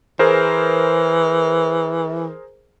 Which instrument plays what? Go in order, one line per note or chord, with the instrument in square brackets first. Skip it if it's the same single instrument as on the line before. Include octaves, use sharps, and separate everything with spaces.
[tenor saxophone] E3 [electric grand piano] G#4 A#4 C5